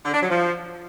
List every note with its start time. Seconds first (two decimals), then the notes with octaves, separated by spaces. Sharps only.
0.05 D3
0.13 D4
0.21 F#3
0.30 F3